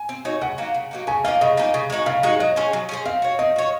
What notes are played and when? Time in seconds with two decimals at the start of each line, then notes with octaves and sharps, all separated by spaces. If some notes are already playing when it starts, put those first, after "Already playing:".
Already playing: G#5
0.09 C4
0.25 D#4 F#4 C#5
0.41 C#3 F#5
0.58 F#3 A#3 D#4
0.74 C#3
0.91 F#3 A#3 D#4
1.07 C#3 G#5
1.24 F3 A#3 D#4 F5
1.41 C#3 D#5
1.57 F3 A#3 D#4
1.74 C#3
1.90 G#3 D#4 F#4
2.06 C#3 F5
2.23 G#3 D#4 F#4
2.40 F#3 D#5
2.56 C#4 G#4 C5
2.73 F#3
2.89 C#4 G#4 C5
3.05 C4 F5
3.22 F#4 C#5
3.39 C4 D#5
3.56 F#4 C#5